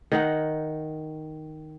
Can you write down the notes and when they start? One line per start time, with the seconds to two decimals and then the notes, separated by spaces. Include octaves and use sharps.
0.12 D#3 D#4 F#5